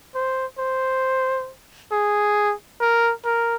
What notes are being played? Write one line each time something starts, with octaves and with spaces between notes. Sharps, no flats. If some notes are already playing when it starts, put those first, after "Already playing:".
C5
C5
G#4
A#4
A#4